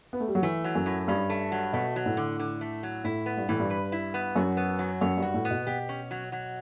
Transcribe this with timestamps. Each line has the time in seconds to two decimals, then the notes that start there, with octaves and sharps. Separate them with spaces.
0.13 B3
0.20 A3
0.28 G3
0.35 F#3
0.42 E3 A3
0.64 F#3
0.75 F#2
0.86 A2
1.08 G2 C#4
1.29 A3
1.52 F#3
1.73 B2 A3
1.96 F#3
2.06 A2
2.17 D3
2.40 D3
2.61 A3
2.83 F#3
3.04 A2 E4
3.26 B3
3.37 G2
3.49 A2 E3
3.60 G2
3.70 B4
3.92 E4
4.14 B3
4.36 F#2 F#4
4.57 B3
4.79 F#3
5.01 F#2 C#5
5.17 G2
5.22 F#4
5.34 A2
5.45 B3
5.51 B2
5.67 B2 G4
5.89 C#4
6.11 F#3
6.32 F#3